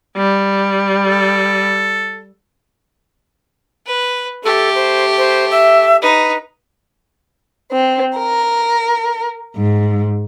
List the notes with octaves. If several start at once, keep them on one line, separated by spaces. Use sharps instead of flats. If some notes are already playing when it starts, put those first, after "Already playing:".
G3
A4
B4
A3 G4 A4
C5
C5
E5
D#4 B4
C4
A#4
G#2